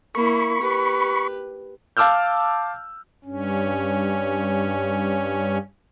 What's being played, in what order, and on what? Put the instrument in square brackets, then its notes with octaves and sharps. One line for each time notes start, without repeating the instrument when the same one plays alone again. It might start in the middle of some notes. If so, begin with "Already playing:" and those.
[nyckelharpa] A#3 E4 [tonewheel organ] B5 C#6
[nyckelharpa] G4 B4
[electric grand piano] F5 A5 D6 E6 F6 G6
[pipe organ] G2 C#4